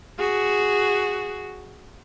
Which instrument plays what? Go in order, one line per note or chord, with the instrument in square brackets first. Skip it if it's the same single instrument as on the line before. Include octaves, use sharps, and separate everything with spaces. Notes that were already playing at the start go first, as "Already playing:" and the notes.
[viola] F#4 G#4